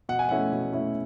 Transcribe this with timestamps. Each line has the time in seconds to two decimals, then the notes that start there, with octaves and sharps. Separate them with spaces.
0.09 B2 F#5
0.19 G#5
0.29 A3 C#4 E4 F#5
0.52 B2
0.73 A3 C#4 E4